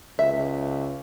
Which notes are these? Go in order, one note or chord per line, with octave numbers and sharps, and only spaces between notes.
C#2 E5